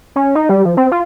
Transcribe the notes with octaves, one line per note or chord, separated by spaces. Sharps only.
C#4
D#4
G3
F3
C4
F4